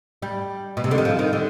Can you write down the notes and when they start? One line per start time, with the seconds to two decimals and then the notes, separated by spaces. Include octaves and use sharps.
0.22 G3
0.77 B2
0.84 C3
0.91 D3
0.98 D#3
1.05 F3
1.19 D#3
1.33 D3